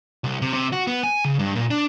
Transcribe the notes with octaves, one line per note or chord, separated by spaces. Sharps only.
C2
C3
C3
F#4
B3
G#5
C#3
G2
A#2
D4